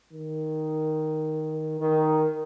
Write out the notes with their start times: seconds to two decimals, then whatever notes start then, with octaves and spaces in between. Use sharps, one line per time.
0.12 D#3
1.80 D#3